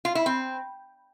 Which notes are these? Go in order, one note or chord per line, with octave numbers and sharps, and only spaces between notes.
F4
E4
C4